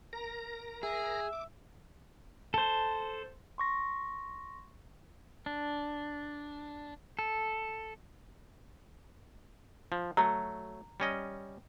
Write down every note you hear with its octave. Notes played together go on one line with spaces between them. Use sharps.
A#4 A#5 A#6
G#4 E5
D6
A4 C5
C6 C#6 A#6
D4
A4
F3
F#3 A3 A#5
G3 C#4 D#5